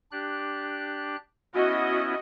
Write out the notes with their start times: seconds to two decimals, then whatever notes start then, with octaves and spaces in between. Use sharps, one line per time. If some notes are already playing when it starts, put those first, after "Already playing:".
0.12 D4 G4 F#6
1.55 B3 C#4 E4 F#4 D#5